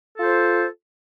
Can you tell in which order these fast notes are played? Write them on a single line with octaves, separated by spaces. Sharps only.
A4 F4 C5